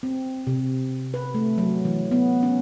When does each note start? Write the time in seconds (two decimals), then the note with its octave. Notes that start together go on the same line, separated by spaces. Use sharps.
0.03 C4
0.47 C3
1.14 B4
1.35 A3
1.58 F#3
1.85 E3
2.11 B3
2.43 C#4